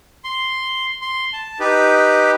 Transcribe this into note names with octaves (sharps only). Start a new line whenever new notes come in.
C6
C6
A5
D#4 G4 B4